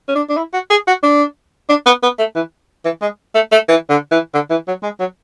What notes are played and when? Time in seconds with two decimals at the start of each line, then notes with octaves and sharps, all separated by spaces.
0.08 C#4
0.15 D4
0.30 D4
0.37 E4
0.54 F#4
0.70 G#4
0.87 F#4
1.03 D4
1.69 D4
1.86 B3
2.03 B3
2.19 A3
2.36 E3
2.85 E3
3.02 G#3
3.35 A3
3.52 A3
3.68 E3
3.90 D3
4.11 E3
4.34 D3
4.50 E3
4.68 F#3
4.83 G#3
5.00 F#3